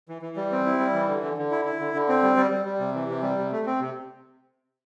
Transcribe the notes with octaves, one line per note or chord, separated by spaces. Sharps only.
E3
E3
G3
C4
E4
G3
E3
D3
D3
D3
E4
E4
D3
D3
C4
G3
G3
G3
G3
C3
E3
C3
G3
C3
A3
C4
C3